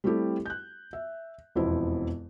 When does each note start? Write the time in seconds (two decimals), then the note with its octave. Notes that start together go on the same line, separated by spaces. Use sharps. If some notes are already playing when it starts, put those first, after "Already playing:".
0.04 G3 A3 C4 E4 G4 A4
0.46 F#6 G6
0.93 E5
1.55 E1 F2 B3 E4 C5